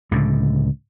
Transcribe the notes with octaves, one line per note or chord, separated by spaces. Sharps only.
C#2 A2 D3